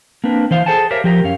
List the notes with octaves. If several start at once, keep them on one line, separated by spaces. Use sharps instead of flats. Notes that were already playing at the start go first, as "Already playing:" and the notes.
A#3 C4 D4 B4
E3 C5 F5
G#4 A4 C5 F#5 G#5 A5
G4 A#4 C5 C#5 E5 F5
F3 G4 A#4
F#2 C#4 C#5 F5